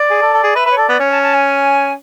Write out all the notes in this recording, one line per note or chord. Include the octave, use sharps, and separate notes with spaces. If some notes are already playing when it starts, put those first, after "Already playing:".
Already playing: D5
G#4
A4
A4
G#4
B4 E5
B4
C#5
A4 D5
B3
C#4 C#5
A5
A5
G#5